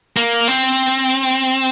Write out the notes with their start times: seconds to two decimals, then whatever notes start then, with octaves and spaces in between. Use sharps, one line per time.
0.17 A#3
0.48 C4